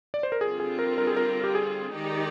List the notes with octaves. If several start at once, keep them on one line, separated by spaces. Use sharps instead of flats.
D5
C5
A#4
D3 G3 C4 F4 G#4
G#4
A#4
A#4
G#4
A#4
G4
G#4
D#3 G#3 D#4 G4 D5